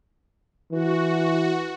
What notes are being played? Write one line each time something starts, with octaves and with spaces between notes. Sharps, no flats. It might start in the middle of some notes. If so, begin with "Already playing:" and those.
E3 F#4